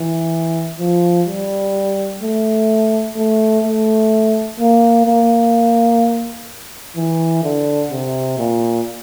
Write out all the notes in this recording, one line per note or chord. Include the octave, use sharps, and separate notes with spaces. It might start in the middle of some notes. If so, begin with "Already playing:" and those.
Already playing: E3
F3
G3
A3
A3
A3
A#3
A#3
E3
D3
C3
A#2